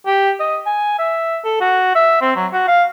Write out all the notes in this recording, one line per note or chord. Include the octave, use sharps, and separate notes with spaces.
G4
D#5
G#5
E5
A4
F#4
E5
C4
F#3
F#4
F5